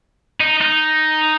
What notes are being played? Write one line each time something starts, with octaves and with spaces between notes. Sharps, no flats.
D#4
D#4